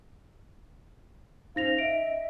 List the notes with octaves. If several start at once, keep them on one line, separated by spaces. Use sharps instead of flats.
C#4 D#4 C5 F5 A#6 F7
D#5 E5 D7